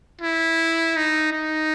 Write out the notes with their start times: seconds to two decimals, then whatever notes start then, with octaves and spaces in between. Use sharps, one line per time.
0.22 E4
0.96 D#4
1.32 D#4